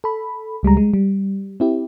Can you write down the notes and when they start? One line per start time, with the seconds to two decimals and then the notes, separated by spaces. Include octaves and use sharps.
0.04 A4 B5
0.63 C#2 G3 G#3 A#5
0.77 G#3
0.94 G3
1.60 C4 E4 G4